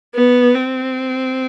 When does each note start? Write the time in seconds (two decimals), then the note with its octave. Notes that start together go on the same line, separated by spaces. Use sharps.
0.15 B3
0.55 C4